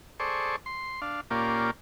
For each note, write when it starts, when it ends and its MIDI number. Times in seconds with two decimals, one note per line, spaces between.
0.20 0.56 68
0.20 0.56 69
0.20 0.56 72
0.20 0.56 74
0.20 0.56 85
0.66 1.01 84
1.02 1.21 62
1.02 1.21 77
1.31 1.71 46
1.31 1.71 58
1.31 1.71 61
1.31 1.71 65
1.31 1.71 67
1.31 1.71 74